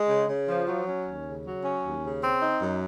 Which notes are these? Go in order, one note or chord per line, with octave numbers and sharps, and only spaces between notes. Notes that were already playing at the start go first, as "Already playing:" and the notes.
Already playing: G#3
C#3
C#3
F3
F#3
C#4
D#2
C#3
F#3
C#4
D#2
C#3
C4
D#4
F#2